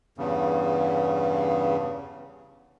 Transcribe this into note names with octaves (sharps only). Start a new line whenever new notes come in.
E2 G2 C#3